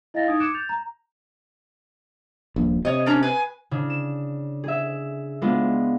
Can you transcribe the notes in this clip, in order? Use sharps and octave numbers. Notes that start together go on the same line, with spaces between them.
E4 D#5 F5 G5 A6 A#6
D#4 D#6 G#6 A6 D7
D6 F#6 G#6 C#7 D7 E7
G6 A6 F7
A#5
D#1 A#1
C3 C#5 D#5
C#4 D4 A#4 A#5
B4 G#5
C#3 D4
E7
G#4 E5
G#3 B3 D4 F4